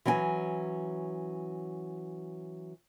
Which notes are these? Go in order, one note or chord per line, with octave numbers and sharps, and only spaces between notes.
E3 F#3 C#4 G5 G#5